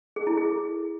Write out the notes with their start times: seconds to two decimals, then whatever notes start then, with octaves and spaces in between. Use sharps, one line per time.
0.16 G#4
0.27 E4
0.37 G#4